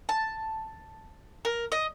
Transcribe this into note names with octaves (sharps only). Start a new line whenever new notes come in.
A5
A#4
D#5